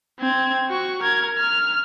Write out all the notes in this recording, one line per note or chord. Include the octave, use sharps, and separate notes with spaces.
C4 G#6
F#4 C#6
A#4 G#6
F6